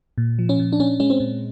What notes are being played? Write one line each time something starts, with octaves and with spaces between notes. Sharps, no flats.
A#2
F3
C#4
A#2
D4
A#2 C#4
G#3 C#4
C4
A#2